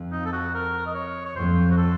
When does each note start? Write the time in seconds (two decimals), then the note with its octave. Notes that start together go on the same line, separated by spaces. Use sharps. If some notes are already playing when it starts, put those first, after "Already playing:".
Already playing: F2
0.12 D#4
0.25 A4
0.32 F#4
0.54 A#4
0.86 D#5
0.94 C#5
1.25 C#5
1.36 F2 C5
1.71 F#4
1.77 A4